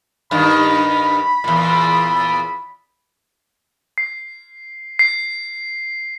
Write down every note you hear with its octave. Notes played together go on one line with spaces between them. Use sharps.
G2 D#3 B5
E2 A#2
C7
C7